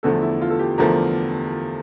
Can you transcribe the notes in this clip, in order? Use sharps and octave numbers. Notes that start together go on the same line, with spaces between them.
E2 D3 F3 A3 A4
E4
F4
A4
G4
E2 D3 F3 A3 A#4